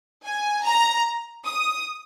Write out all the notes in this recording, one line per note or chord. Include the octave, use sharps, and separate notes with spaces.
G#5
A#5
D#6